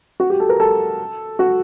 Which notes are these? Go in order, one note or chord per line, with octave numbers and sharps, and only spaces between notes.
F#4
G4
A4
A#4
A4
F#4